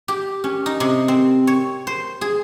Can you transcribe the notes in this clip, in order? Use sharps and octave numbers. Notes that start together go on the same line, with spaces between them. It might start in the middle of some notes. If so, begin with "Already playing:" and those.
G4
C#4
D#4
C3
C4
C#5
C5
G#4